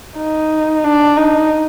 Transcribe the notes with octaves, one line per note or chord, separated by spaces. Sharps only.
D#4
D4
D#4